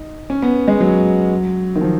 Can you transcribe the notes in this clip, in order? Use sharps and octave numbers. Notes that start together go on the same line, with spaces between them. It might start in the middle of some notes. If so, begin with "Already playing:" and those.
Already playing: D#4
C#4
B3
G#3
F#3
D#3
F3